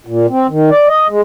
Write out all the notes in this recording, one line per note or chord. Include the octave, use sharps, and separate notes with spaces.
A#2
C4
D#3
D5
D#5
G#3